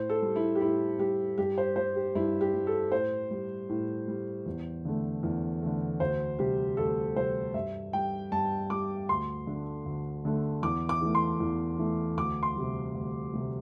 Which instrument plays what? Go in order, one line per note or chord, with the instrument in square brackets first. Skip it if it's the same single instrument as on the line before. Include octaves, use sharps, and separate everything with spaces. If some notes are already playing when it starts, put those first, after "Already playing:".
Already playing: [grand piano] A2 C5
A4
G3
E4
G4
A2 E4
G3 G4
G2 G4
C5
G3 C5
G4
G2 E4
G4
G3
A4
A2 C5
G3
A2
G3
E2
D3 A3
E2
D3 A3
D2 C5
C3 G3 G4
D2 A4
C3 G3 C5
G2 E5
G3 G5
G2 A5
G3 D6
D2 C6
D3 A3
D2
D3 A3
E2 D6
D6
E3 A3
C6
E2
E3 A3
D2 D6
C6
C3 G3
D2
C3 G3